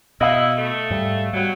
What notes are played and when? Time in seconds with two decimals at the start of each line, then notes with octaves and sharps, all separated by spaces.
0.21 B2 B3 E4 D#5 F5
0.58 A3
0.90 G#2 G3
1.33 B2 F#3 G3